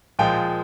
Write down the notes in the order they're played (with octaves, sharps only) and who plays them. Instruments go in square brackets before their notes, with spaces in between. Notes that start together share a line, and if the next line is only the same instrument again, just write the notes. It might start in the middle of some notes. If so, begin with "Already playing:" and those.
[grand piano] A#2 F3 G#3 G5